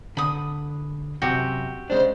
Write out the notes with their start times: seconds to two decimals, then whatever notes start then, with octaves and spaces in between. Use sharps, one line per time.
0.17 D3 B5 D#6
1.22 F#2 C3 F#4 G4 E5
1.90 C#3 G#3 D4 C5